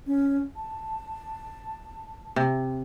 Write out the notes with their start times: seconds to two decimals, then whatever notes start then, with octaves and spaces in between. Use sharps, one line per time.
0.07 C#4
0.56 A5
2.36 C3